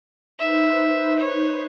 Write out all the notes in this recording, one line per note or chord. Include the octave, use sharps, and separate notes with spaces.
D#4 B4 C5 E5
C#5